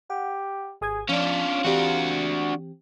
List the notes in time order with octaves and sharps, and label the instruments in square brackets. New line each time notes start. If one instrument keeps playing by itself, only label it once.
[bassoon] G4 [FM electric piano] F#5
[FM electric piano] G#1 D#6 G#6 [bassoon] G#4
[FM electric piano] F3 D5 [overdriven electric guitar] C#4 D4 [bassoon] F4
[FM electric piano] E3 C4 G4 [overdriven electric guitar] D4 F#4